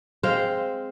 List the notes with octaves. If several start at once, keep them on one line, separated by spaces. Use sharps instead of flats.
G#3 C4 C5 F5